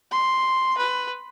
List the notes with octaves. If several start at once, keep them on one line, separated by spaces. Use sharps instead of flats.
C6
B4